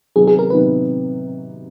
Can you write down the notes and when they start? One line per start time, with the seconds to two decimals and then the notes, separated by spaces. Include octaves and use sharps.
0.16 C3 D#3 F#3 B3 D#4 G#4
0.27 G#4
0.39 A#4
0.50 C3 D#3 F#3 B3 D#4 B4